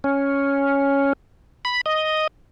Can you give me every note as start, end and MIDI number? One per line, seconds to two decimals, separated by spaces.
0.04 1.13 61
1.65 1.81 83
1.86 2.27 75